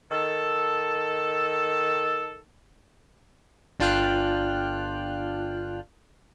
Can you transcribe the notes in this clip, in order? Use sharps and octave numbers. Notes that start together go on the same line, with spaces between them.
D#3 A4
G1 D4 F4 G5 F6 F#6